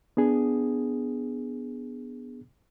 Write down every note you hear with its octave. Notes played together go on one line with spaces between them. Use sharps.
B3 D4 G#4